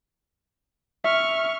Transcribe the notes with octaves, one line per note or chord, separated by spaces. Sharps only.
E5 C#6 F6